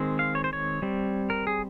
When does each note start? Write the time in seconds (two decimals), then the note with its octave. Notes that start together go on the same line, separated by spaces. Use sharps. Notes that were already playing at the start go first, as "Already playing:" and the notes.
Already playing: D#3 G#3 C4
0.19 F5
0.35 C#5
0.44 C5
0.53 C#5
0.82 G3 C4
1.30 A#4
1.47 G#4